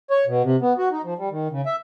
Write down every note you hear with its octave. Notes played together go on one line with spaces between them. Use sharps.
C#5
B2
C3
B3
F#4
D#4
F3
G3
D#3
C#3
E5